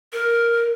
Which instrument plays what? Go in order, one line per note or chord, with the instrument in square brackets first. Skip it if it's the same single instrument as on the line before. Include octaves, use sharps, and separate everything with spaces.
[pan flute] A#4